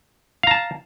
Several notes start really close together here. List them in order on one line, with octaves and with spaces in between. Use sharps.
F5 A#5 A5